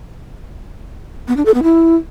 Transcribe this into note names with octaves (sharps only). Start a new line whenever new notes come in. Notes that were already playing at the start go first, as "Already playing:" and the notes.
B3
D4
A4
B3
E4